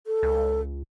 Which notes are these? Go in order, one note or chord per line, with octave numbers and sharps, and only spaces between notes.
A4
C#2